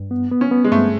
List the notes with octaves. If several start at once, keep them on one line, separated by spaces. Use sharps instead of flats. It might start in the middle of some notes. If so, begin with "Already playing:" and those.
Already playing: G2
B3
B3
C#4
B3
G#3
G2 A3